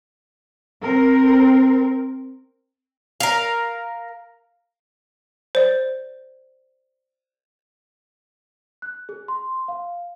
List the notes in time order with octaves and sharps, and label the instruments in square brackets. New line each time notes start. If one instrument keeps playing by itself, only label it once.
[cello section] C4 A#4
[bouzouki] A#4 F5
[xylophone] C5 D5
[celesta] F#6
G#4
C6
F5